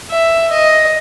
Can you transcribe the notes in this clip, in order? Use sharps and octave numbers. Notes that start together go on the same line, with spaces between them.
E5
D#5